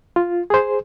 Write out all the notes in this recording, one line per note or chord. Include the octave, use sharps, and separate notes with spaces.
F4
G#4 C5